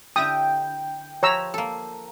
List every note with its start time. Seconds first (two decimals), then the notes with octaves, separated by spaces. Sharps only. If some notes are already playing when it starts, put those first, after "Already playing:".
0.16 D3 E4 G4 G5 D#6
1.23 F3 G4 B4 C#5 A#5 E6
1.54 A#3 A4